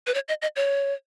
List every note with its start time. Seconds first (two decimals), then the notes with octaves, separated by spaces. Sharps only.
0.07 B4
0.14 C#5
0.28 D#5
0.42 D#5
0.56 C#5